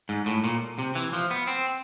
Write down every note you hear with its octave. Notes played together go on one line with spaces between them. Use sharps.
G#2
A2
A#2
C3
E3
F3
B3
C4